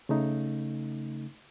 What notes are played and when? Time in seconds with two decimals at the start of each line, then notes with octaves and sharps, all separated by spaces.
0.09 C#3 A3 D#4